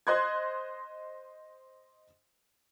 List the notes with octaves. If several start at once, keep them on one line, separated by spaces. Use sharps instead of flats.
C5 D#5 C6 F#6 G#6